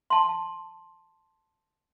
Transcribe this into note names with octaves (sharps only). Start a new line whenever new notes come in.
A5 C6